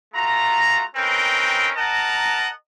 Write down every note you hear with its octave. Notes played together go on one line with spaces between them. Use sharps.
A3 F4 F#4 A#5
C4 C#4 D#4 A#4 B4 G5
A#4 D#5 F#5 A5 A#5